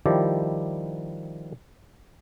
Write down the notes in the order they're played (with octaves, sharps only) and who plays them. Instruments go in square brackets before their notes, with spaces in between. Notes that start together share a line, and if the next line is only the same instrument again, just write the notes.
[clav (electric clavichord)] D#3 F3 G3 E4 G4 D5